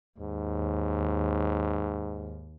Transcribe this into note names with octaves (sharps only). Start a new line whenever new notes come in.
D#2 G#2